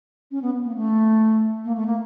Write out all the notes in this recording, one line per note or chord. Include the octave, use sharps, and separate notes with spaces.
C#4
B3
A#3
A3
A#3
A3
A#3